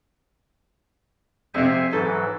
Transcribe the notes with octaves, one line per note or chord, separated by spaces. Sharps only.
F2 C3 C5 E5 G#5
G#2 E3 F#3 A4